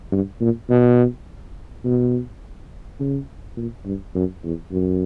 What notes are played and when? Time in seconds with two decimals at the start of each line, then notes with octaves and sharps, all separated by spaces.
0.12 G2
0.41 A#2
0.69 B2
1.84 B2
3.00 C#3
3.57 A#2
3.85 G2
4.15 F#2
4.44 E2
4.72 F#2